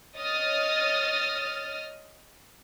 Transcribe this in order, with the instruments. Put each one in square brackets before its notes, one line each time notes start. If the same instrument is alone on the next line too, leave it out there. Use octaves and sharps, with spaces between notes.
[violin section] C#5 D#5 D#6 F6 A6